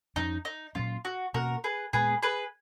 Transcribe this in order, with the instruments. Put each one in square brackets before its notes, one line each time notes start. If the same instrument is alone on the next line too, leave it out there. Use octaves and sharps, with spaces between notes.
[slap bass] F2 F3 G#3 C#4 [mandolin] D#4
[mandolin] D#4
[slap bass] A#2 F#3 C#4 [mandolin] F4
[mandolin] F#4
[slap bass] B2 A#3 C#4 [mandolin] F#4 A#4
[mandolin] G#4 B4
[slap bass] A#2 G#3 B3 [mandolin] G#4 B4
[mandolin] G#4 B4